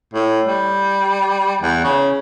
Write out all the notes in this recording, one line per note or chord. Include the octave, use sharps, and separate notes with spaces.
A2
G3
E2
C#3